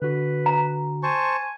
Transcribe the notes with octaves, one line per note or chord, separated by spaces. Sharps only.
D3 F#4 B4
A#5
C5 G#5 A5 C#6